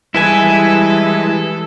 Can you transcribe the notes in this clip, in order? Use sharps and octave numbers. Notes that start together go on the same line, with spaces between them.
E3 G3 G#3 E4 A4 B4 G#5